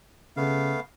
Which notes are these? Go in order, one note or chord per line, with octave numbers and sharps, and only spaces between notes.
C#3 A3 B3 F5